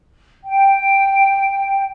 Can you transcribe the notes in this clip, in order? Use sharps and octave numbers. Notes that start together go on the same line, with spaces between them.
G5